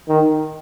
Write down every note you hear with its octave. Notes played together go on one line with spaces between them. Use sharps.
D#3